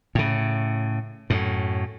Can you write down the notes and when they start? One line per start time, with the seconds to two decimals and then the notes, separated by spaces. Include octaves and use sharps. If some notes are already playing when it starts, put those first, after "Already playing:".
0.15 A2 C#3
1.30 F#2 A2